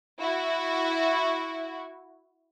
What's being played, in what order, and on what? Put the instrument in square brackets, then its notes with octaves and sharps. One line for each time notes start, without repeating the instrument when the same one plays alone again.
[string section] E4 F#4